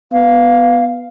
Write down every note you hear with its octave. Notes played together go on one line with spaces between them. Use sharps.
B3 F5